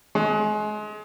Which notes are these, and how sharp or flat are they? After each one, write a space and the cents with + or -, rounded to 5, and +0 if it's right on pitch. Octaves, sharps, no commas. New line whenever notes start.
G#3 +30